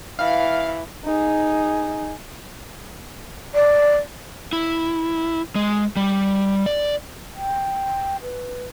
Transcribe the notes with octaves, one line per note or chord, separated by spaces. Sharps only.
E3 F5
D#4 G#4
D5
E4
G#3
G3
D5
G5
B4